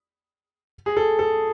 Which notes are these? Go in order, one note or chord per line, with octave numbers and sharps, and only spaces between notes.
G#4
A4
A4